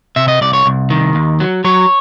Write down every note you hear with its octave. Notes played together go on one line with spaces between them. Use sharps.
C3 E5
D#5
C2 D5
C#5
C2
D#3
D#2
F#3
F#3 C#5